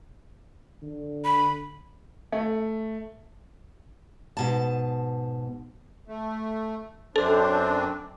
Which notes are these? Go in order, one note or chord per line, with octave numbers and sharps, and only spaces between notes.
D3
B5
A3
G#2 B2 A5
A3
F#2 C4 D4 A4